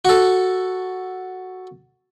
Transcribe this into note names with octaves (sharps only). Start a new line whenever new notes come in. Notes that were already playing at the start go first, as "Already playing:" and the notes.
F#4 A4